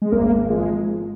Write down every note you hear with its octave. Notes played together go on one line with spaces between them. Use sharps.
G#3
G#1 A#3
G#2
F3 G#3